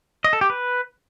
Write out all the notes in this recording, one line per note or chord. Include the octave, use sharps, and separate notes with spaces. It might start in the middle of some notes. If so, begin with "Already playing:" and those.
D#5
A4
G4
B4